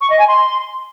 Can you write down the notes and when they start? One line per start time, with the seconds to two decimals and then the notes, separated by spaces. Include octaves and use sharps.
0.01 C#6
0.10 D#5
0.19 G#5
0.28 C6